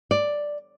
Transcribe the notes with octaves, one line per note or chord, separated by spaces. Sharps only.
D5